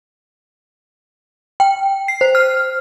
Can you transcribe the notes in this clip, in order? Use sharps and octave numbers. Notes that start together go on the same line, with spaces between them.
G5
C7
C5
F6